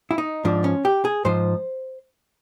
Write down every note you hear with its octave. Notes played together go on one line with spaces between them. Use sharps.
E4
D#4
G#2 F3 D4
C#4
G4
G#4
G#2 F3 C5